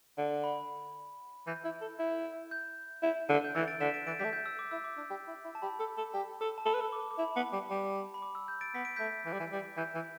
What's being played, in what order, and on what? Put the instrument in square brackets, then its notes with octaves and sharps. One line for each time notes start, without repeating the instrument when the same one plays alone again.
[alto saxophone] D3
[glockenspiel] B5
[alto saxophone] E3 [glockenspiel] G6
[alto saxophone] E4
A4
E4
[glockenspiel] G6
[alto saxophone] E4
D3
[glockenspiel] G6
[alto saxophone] E3 [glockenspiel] E6 A6
[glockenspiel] A6 D7
[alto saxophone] D3 [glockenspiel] B6 E7
[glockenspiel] A6 D7
[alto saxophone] E3 [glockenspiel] A6 D7
[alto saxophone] G3 [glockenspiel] G6 B6
[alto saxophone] A3
[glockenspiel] G6
E6
D6
[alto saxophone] E4 [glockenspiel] E6
[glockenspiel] D6
[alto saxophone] D4
G4
E4
E4
[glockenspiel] A5
[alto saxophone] G4 [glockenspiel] B5
[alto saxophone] A4
A4
G4
A4
[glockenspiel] A5
[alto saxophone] A4 [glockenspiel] B5
[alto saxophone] B4
A4
[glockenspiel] D6
D6
[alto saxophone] E4 [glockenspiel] B5
[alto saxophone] B3
G3
G3
[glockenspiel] B5
D6
E6
G6
A6 D7
[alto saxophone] B3 [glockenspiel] B6
[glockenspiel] D7
[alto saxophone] A3 [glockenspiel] G6 B6
[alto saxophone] E3
G3
E3
G3
[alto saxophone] E3 [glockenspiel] G6
[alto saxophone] E3